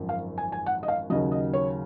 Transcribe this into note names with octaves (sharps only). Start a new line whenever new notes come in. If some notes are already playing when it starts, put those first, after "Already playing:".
Already playing: G#1 F#2 F3
F5
G#5
G#5
F#5
D#5
F5
D#2 C#3 F#3 D#5
D#5
C#5